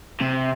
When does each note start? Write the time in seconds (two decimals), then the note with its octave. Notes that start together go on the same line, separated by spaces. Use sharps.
0.20 C3